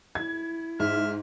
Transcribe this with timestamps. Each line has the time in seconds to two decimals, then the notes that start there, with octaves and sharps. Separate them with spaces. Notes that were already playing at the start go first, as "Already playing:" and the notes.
0.15 E4 G#6
0.80 G#2 E5 F6